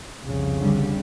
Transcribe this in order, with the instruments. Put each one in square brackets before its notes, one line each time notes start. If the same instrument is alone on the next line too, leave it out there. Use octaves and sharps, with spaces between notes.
[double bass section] C2 F2 C#3
[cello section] D3 G3